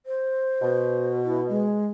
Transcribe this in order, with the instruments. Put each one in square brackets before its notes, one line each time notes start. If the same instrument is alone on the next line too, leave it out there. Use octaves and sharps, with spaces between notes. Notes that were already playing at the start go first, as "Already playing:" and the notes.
[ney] C5
[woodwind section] B2
[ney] E4
G#3